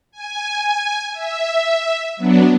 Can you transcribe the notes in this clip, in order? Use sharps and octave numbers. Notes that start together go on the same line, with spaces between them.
G#5
E5
F#3 B3 D4